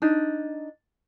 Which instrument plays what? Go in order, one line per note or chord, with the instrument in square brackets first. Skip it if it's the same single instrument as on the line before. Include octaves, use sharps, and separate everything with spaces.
[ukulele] D4 D#4